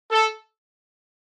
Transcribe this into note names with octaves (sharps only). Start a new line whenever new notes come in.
A4